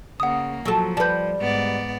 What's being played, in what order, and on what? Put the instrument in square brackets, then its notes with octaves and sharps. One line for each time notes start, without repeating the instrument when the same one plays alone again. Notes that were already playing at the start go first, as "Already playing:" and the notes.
[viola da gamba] C#3 A#3 [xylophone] F#5 D#6
[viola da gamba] F3 [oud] F#3 A4
[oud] G3 B4 [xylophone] A5 G6
[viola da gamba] G#2 B3 D5